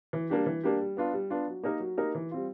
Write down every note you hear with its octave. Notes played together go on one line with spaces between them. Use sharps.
E3
G3 A#3 D4 G4
E3
G3 A#3 D4 G4
G3
B3 D4 F4
G3
B3 D4 F4
F#3
A#3 D#4 G4 A#4
F#3
A#3 D#4 G4 A#4
E3
G3 C4 F4